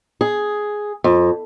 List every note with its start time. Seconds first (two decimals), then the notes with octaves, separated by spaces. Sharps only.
0.21 G#4
1.04 F2